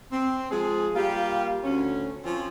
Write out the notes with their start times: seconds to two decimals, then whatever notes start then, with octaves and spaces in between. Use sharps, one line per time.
0.12 C4
0.51 F3 G#3 G#4
0.95 G3 A#3 F4 G4
1.64 D2 C#4
2.23 F3 C4 C#4